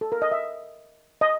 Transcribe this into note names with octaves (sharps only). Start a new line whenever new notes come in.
A4
A#4
D#5
E5
D#5